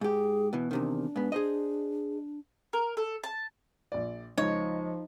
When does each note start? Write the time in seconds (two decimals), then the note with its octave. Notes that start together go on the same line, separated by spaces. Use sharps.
0.01 G#2 G4 G#4
0.53 B2 E3
0.71 E2 C3 D#3 D4
1.16 G#2 B3
1.32 G#4 C5 D#5
2.73 A#4
2.97 A4
3.24 A5
3.92 A#1 D5
4.38 C#2 F3 D#4 C#5